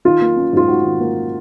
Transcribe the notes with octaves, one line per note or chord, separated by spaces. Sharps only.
D#3 F4
A#3
C#4
G#2 F4
G#2 F#4
D#3
A#3